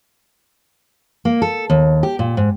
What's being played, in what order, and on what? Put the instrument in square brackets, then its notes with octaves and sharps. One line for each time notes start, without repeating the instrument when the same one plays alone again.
[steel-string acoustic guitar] A#3
A4
D#2
G4
A#2
G#2